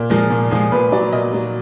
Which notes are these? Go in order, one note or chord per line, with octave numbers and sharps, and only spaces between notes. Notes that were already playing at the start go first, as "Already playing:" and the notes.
Already playing: A#2
F3 G#3 A#4
A#2
F3 G#3 G#4
A#2 B4
F#3 D5
A#2 D#5
F#3